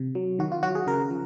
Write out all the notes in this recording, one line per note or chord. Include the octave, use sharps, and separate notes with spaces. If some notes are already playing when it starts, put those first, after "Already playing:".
Already playing: C3
F#3
D#3 F#4
F4
F#3 F#4
G#4
C#3 A#4
F3